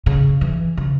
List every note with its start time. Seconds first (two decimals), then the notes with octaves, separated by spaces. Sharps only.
0.06 C#3
0.41 E3
0.77 C#3